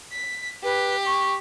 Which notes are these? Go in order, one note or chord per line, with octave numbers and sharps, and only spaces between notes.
B6
G4 B4
C#6